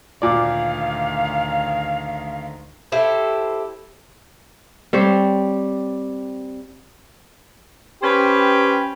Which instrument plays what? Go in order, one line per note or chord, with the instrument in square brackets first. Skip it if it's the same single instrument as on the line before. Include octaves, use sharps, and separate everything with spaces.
[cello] D2 D#3 [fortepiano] A#2 D5 [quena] F5
[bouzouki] E4 G4 A4 C5
[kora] G3 C4 C5 C#5
[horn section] C#4 G4 B4 C5 G5